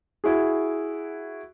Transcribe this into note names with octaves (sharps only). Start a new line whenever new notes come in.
E4 F#4 G#4